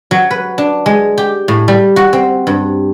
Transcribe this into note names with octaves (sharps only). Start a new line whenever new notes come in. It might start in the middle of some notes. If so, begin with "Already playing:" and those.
F#3
B4
D4
G#3
G4
A2
G3
F#4
C4
G2